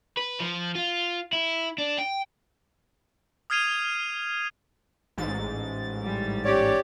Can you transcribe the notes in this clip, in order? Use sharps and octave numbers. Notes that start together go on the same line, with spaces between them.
B4
F3
F4
E4
D4
G5
D#6 F6 G#6 C7 D#7 F7
A1 G#2 A6
G3
C#4 G4 C#5 D5